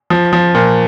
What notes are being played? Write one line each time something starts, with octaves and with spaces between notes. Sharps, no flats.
F3
F3
A#2